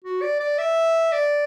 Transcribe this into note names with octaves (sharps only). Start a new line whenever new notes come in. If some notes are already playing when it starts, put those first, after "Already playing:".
F#4
D5
D5
E5
D5